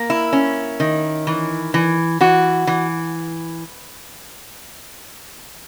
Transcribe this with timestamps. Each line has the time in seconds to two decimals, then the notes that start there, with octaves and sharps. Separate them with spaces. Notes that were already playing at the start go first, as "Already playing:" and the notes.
Already playing: A#3
0.10 E4
0.33 C#4
0.80 D#3
1.27 E3
1.74 E3
2.21 E3 F#4
2.67 E3